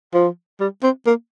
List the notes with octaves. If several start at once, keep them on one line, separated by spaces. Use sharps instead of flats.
F3
G3
C4
A#3